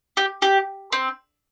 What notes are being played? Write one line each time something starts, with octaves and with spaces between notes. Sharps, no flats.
G4
G4
C4